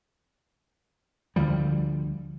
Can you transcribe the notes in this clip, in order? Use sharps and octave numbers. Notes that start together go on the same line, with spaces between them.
D2 D3 F3 G3